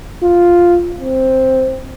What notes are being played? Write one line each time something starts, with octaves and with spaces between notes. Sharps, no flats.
F4
C4